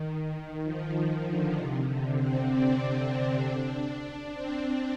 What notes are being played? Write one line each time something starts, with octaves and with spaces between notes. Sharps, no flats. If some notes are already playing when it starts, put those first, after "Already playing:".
Already playing: D#3
D#3
F3
D#3
D3
C3
D3
C4
D4
C4